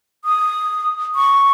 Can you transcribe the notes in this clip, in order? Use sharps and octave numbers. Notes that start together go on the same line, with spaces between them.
D#6
C#6